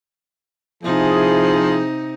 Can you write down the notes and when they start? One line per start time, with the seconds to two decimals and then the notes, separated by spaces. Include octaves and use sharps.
0.83 C3 F3 D#4 E4 G#4